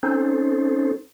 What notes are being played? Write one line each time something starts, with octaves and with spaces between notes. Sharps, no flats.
C4 C#4 D#4 A4 C5